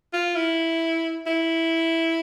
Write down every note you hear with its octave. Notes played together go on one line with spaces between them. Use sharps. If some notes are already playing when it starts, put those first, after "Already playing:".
F4
E4
E4